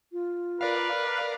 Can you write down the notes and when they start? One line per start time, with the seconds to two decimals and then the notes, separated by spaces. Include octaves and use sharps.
0.12 F4
0.61 A#4 B4 D5 F5